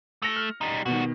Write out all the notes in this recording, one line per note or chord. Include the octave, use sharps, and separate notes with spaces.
A3 A#6 C#7 F7
F6
G3 D#4
B2 D#3 G3 F#4